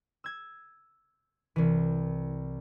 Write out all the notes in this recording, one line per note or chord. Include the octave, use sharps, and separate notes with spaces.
E6 G#6
C2 E3